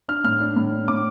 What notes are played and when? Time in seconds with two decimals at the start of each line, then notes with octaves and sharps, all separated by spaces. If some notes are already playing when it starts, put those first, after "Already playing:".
0.08 D4 F6
0.24 A2 F6
0.40 D4
0.56 A2
0.72 D4
0.88 A2 D6